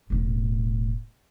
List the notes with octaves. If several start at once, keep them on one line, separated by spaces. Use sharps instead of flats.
E1 A2